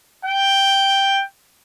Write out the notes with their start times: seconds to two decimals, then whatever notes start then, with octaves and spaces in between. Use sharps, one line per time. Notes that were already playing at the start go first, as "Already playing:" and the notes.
0.25 G5